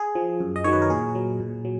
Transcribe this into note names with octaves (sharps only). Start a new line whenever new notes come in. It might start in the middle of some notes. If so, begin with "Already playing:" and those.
Already playing: G#4
F3
F#2
D#5
D#3 F#3 C#5
B4
A#4
A#2 G#4
F#3
A#2
F#3